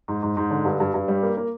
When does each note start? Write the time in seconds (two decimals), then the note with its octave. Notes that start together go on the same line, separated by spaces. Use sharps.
0.08 G#2
0.23 G#2
0.37 G#2
0.51 D3
0.65 G2
0.80 G2
0.94 G2
1.08 G3
1.23 A#3
1.37 A#3